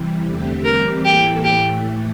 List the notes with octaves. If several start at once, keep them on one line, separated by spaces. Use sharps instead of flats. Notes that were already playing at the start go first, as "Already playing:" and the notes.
Already playing: C3 E3 G3
E2 D3 A3 C4 G4
E3 G3 C4 G4 A#4
A2 E3 A#3 E4 G4 A4
A2 E3 A3 G4